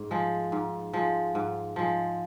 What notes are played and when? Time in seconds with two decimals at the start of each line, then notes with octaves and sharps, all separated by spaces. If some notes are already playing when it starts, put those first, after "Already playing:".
Already playing: G#2
0.11 F3 G#3
0.52 G#2
0.93 F3 G#3
1.35 G#2
1.76 F3 G#3